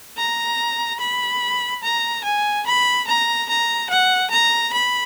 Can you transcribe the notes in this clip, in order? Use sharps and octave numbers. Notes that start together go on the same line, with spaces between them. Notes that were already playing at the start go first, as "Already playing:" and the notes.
A#5
B5
A#5
G#5
B5
A#5
A#5
F#5
A#5
B5